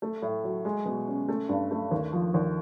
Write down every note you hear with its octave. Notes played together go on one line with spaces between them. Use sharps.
A3
A2
F#3
G#3
B2
C#4
A3
G2
A3
D#2
F3
D#2